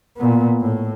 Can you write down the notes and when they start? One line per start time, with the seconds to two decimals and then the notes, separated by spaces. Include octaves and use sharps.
0.16 A#2 B3
0.61 A2